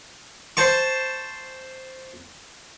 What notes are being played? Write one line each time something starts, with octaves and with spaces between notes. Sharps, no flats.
C5 A5 C#6